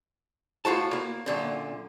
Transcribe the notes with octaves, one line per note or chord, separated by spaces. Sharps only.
A2 F4 F#4 A5
A#3
F#2 A#2 D3